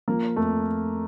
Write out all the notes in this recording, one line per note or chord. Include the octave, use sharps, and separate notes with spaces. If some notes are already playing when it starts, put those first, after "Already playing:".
F3 A#3
F2 A3